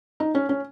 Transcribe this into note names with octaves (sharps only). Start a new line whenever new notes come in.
D#4
C#4
C#4